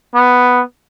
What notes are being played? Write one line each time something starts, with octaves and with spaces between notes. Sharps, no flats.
B3